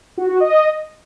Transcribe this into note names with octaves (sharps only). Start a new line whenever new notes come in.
F#4
F#4
D#5